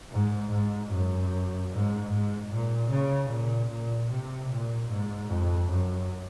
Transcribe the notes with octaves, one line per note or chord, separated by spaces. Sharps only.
G#2
G#2
F#2
G#2
G#2
A#2
C#3
A#2
A#2
C3
A#2
G#2
F2
F#2